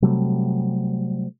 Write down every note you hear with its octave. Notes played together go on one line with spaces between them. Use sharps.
C3 F#3 G3 A3